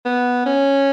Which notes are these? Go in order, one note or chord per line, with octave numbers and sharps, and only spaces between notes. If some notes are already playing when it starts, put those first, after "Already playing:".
B3
C#4